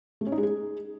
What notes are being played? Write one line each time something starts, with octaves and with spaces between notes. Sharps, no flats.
A3
C#4
D#4
G#3
G#4